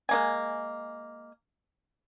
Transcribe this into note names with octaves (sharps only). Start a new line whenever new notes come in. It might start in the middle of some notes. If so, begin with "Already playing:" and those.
G#3 A#3 G#5